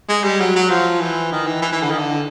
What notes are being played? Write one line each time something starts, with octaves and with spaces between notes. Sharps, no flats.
G#3
G3
F#3
F#3
F3
E3
D#3
E3
E3
E3
D3
D#3
D3